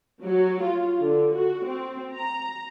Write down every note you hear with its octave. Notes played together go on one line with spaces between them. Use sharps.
F#3
F4
D3
F#4
C4
A#5